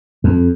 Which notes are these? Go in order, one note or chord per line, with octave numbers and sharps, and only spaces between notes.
F2